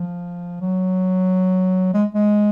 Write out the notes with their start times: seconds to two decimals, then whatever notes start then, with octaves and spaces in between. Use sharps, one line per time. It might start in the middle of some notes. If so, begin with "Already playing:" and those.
Already playing: F3
0.61 F#3
1.93 G#3
2.14 G#3